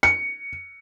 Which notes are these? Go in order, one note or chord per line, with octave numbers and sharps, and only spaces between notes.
C#7